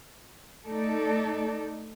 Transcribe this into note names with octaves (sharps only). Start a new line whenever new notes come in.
A3 D#4 A4 D5